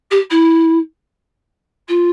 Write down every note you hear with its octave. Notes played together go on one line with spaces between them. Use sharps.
G4
E4
F4